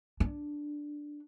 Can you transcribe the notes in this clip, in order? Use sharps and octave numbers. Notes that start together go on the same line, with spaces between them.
D4